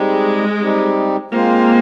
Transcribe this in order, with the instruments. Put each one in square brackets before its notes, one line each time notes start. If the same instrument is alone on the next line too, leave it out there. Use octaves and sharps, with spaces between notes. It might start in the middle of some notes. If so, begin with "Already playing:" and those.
Already playing: [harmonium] G3 C4 D#4 G4 [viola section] G#3
[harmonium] G3 C4 D#4 G4
[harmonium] G#3 C4 F4 C5 [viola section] A#3